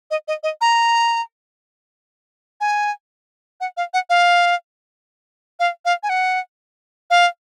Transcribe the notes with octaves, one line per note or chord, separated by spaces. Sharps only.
D#5
D#5
D#5
A#5
G#5
F#5
F5
F#5
F5
F5
F5
G#5
F#5
F5